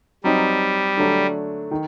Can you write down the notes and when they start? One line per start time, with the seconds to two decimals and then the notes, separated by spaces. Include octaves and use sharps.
0.24 F#3 G3 C4 D#4
0.97 D3 F#3 A3 D4
1.71 D#3